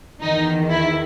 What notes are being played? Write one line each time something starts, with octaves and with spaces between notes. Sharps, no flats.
E2 D#3 D#4
E4